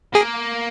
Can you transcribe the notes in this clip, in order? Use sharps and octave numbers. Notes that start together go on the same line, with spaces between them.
A#3 G#4